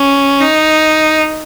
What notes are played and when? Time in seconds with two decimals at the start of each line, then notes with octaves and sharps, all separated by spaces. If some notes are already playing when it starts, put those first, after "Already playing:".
Already playing: C#4
0.40 D#4